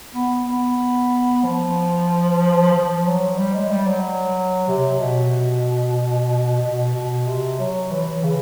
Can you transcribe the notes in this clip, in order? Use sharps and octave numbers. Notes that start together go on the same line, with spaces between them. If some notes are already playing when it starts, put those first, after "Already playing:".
B3
B3
F3
F3
F#3
G3
G#3
G3
F#3
C3
B2
B2
B2
C3
F#3
E3
C#3